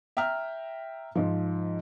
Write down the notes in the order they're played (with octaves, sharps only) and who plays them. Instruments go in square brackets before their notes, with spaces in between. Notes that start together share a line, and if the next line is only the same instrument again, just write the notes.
[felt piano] E5 G5 A#5 F6
G#2 F3